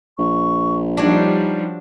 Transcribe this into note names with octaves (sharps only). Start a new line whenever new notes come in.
A#1 C#6
F3 G3 D4 D#4 F#4 C#5